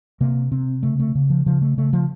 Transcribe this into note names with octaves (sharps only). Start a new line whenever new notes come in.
C3 A#3
C3 C4
C#3 A3
A3
C#3
F3
C#3 F3
A3
C#3 A3
F3